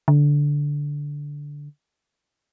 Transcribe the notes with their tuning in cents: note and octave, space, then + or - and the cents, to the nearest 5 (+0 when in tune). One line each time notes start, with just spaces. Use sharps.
D3 -10